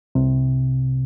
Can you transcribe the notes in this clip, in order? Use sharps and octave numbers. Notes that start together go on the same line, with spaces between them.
C2 C3